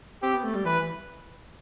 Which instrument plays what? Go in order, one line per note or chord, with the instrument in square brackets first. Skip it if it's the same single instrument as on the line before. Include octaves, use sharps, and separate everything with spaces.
[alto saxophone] C4 [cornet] G4
[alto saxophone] B3
A3
G3
[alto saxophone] E3 [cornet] B4
[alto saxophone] E3